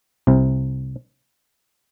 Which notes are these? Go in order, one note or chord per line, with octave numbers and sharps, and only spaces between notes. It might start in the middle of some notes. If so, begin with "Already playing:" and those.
C2 C3